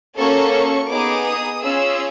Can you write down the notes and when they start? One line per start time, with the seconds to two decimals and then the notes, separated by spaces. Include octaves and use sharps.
0.17 A#3 C#4 F#4 A4 C#6
0.90 B3 D#4 G#4 D6
1.25 D#6
1.62 C#4 F4 G#4 E6